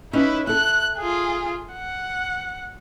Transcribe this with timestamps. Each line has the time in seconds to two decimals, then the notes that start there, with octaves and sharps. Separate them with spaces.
0.13 C#4 D#4 E4 B4
0.47 E4 A4 F#6
0.98 F4 G#4
1.73 F#5